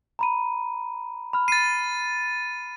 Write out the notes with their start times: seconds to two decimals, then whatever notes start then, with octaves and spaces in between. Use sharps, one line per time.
0.19 A#5 B5 D#7
1.33 B5 F6
1.48 A6 C7 D#7